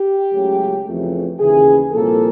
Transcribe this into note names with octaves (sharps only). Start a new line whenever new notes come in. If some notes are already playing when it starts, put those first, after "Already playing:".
Already playing: G4
C#2 C#3 F#3 A3
F2 C#3 E3 A3
D#2 C#3 E3 G#4
C2 A#2 F3 A#3 A4